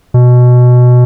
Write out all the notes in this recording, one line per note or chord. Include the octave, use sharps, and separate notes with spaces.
B2